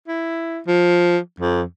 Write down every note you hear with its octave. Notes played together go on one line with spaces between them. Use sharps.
E4
F3
F2